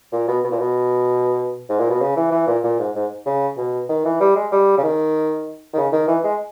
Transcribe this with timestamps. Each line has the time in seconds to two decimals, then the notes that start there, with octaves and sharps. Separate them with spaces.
0.12 A#2
0.28 B2
0.44 B2
0.51 A#2
0.59 B2
1.69 G#2
1.80 A#2
1.90 B2
2.01 C#3
2.16 E3
2.32 E3
2.47 A#2
2.64 A#2
2.79 G#2
2.95 G#2
3.26 C#3
3.58 B2
3.89 D#3
4.05 E3
4.21 G3
4.36 G#3
4.52 G3
4.78 C#3
4.83 D#3
5.74 D#3
5.77 C#3
5.93 D#3
6.08 E3
6.24 G#3